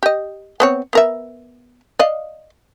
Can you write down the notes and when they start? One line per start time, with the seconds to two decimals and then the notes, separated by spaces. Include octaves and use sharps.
0.03 G4 D#5
0.60 B3 C4 C#5
0.93 B3 A#4 E5
1.99 D5 D#5 F5